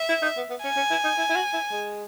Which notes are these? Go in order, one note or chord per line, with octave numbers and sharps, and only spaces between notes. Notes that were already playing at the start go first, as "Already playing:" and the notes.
Already playing: E5
E4
D#4
B3
B3
C#4 G#5
C#4
E4
D#4
E4
E4
F#4
E4
G#3